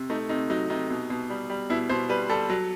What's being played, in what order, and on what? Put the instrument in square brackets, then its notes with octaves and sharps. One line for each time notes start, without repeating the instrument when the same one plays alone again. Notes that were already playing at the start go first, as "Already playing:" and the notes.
Already playing: [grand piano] C3
A3 D#4
C3 D#4
F#3 D#4
C3 D#4
B2
B2
G3
G3
B2 E4
B2 C5
G3 B4
G3 A4
F#3